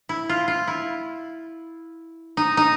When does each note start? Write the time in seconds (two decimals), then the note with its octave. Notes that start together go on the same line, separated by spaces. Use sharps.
0.09 E4
0.29 F4
0.48 F4
0.67 E4
2.37 D#4
2.57 D#4